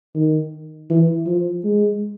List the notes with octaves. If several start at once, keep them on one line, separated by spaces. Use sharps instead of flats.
D#3
E3
F3
G#3